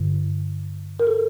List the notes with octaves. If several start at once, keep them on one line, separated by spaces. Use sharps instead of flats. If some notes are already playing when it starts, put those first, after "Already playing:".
Already playing: G2 D3
A#4
A4